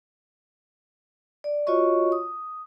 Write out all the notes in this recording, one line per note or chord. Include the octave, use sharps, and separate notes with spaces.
D5
F4 F#4 C#5 D#5 C#6
D#6